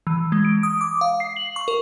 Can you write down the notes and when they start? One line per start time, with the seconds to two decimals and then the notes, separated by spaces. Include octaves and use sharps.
0.07 E3
0.32 G#3
0.45 D7
0.63 D#6
0.81 D6
1.01 F5
1.20 C7
1.36 F#7
1.56 C#6
1.68 A#4